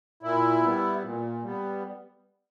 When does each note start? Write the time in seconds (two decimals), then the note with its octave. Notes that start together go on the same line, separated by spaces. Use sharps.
0.23 A#2 E4
0.63 G3 B3
1.03 A#2
1.43 G3 B3